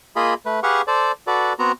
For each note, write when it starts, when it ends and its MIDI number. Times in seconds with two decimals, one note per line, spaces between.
0.16 0.34 58
0.16 0.34 65
0.16 0.34 68
0.16 0.34 75
0.16 0.34 83
0.46 0.60 57
0.46 0.60 71
0.63 0.82 67
0.63 0.82 68
0.63 0.82 71
0.63 0.82 77
0.63 0.82 78
0.63 0.82 85
0.87 1.12 69
0.87 1.12 72
0.87 1.12 74
1.27 1.53 66
1.27 1.53 69
1.27 1.53 71
1.27 1.53 74
1.59 1.72 59
1.59 1.72 60
1.59 1.72 66
1.59 1.72 82